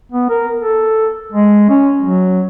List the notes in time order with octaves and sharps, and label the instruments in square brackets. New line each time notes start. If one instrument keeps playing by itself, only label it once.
[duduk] B3
A#4
A4
G#3
C#4
F#3